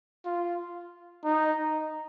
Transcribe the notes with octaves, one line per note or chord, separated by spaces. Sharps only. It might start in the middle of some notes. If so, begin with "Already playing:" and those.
F4
D#4